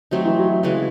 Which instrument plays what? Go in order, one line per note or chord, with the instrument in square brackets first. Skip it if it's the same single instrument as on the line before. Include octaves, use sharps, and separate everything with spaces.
[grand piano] F#3 [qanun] A3 C4 D#4
[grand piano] E3
F#3
[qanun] C#3 E3 G#3